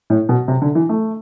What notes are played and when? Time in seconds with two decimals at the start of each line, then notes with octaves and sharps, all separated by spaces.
0.10 A2
0.29 B2
0.48 C3
0.62 D3
0.75 E3
0.89 A3